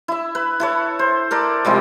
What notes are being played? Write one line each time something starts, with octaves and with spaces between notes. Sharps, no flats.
E4 E5
B4
E4 A4 C#5
C5
A4 A#4 D5
C3 F3 G3 G#3